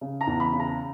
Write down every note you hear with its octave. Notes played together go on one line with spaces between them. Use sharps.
C#3
A#5
E2
B5
C#3
A#5